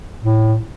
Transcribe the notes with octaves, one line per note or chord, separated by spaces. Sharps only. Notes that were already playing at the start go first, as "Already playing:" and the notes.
A2